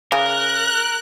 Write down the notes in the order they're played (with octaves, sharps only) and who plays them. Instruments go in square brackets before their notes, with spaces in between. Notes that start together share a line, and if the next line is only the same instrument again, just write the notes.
[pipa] C#3 [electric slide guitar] A#4 [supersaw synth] F#6